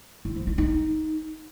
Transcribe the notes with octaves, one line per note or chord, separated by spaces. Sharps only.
E4
F3
E4
D#4